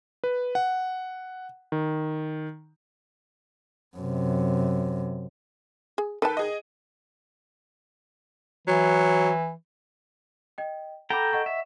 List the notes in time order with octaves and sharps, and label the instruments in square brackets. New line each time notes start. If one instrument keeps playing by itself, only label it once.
[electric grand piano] B4
F#5
D#3
[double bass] F#2 C3
[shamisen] G#4
[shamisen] D#3 A5 [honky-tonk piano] A4 B4 G5
[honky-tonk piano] G#4 D#5
[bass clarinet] E3 [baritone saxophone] F#3
[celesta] D#5 G5
[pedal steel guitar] A4 G5 A#5 [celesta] F#5 B5 D6
[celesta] D#5 F#5 C#6
[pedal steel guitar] E5